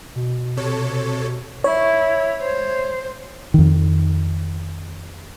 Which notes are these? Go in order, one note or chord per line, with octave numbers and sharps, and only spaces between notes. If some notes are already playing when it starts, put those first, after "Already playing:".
B2
C3 A4 C#5
E4 C#5
C5
F2 D#3